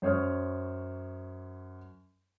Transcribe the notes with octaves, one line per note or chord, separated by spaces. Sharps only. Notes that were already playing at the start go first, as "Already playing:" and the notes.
F#2 C5 C#5 D#6 F6